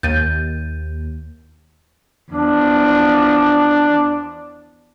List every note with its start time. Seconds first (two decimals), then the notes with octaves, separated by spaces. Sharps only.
0.03 D#2 G6 A6 D#7
2.32 E2 F3 D4